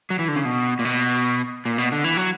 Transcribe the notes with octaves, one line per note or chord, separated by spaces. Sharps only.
F#3
E3
D3
C#3
B2
A#2
B2
A#2
B2
D3
E3
F#3